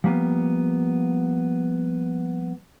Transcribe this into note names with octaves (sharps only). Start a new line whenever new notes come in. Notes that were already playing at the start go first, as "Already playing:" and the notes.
F3 G3 A#3 B3